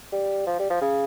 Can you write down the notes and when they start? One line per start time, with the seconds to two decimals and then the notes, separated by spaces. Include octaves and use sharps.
0.12 G3
0.47 F3
0.59 G3
0.70 F3
0.81 C#3